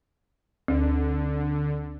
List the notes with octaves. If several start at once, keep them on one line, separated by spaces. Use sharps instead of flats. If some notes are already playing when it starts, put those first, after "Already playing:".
D2 D3